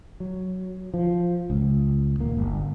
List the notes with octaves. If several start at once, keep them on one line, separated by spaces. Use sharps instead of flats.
F#3
F3
C#2
D#1 A#3
G1